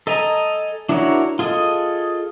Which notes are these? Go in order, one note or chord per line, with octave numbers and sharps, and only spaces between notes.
A4 D#5 G#5 A#5
D4 E4 F#4 A#4 C#5
F4 G#4 A4 D#5